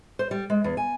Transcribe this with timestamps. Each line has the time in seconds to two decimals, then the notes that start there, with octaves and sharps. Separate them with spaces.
0.19 C5
0.31 G3
0.50 G#3
0.64 E2
0.77 G#5